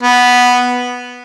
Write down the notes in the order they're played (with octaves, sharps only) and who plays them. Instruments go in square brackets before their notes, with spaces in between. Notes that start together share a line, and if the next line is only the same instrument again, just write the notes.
[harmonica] B3